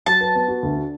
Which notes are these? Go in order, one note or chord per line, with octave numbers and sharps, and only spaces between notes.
F#3 A5
B4
B3
F#4
D2
D4